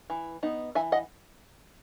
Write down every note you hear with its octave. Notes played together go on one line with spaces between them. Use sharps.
E3
B3 D#4
E3 E5 G#5
D#5 F#5